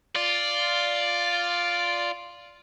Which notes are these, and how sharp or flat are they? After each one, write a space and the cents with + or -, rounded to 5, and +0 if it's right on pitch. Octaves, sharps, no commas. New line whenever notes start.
F4 +0 D5 +0